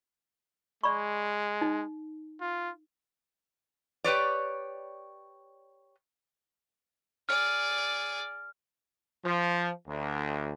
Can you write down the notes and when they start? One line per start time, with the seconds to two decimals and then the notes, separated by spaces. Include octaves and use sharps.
0.83 G#3 D5 B5 C#6
1.61 D#4
2.41 F4
4.04 G4 B4 C#5 D5
7.29 G#4 D5 F6
9.25 F3
9.88 D2